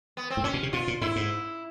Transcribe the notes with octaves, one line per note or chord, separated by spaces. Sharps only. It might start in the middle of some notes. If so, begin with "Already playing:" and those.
B3
C4
A2
A#2 C#4
B2
C3
B2 F4
A#2
G#2 E4
G#2